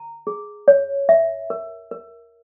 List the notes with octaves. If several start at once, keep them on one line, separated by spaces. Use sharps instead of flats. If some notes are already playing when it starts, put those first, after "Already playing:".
Already playing: A#5
G#4
C#5
E5
A#4
A#4